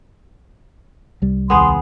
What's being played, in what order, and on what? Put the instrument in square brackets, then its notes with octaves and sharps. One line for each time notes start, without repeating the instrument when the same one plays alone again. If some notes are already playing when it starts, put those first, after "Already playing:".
[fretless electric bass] C2 G3
[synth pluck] A1 D#2 D#3 [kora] B3 G#4 [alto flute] C6